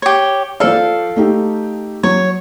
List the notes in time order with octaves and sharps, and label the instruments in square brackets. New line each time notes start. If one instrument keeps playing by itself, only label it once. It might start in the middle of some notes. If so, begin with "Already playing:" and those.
[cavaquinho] G4 C#5
[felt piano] F3 C5 D5 [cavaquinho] A4 F5
[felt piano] A3 D#4 G4
[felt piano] F#3 [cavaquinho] C#5